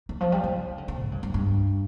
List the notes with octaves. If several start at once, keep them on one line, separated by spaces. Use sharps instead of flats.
D#3
F3
G3
D#3
D3
D3
G#2
G2
G2
G2